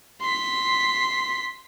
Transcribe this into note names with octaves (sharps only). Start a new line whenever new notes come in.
C6 B6